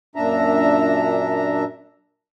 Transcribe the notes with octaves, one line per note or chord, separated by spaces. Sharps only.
F#2 A#2 D4 E5 A#5